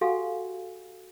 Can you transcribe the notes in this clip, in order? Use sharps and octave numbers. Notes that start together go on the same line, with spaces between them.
F#4 G4 A4 F5 F#5 G#5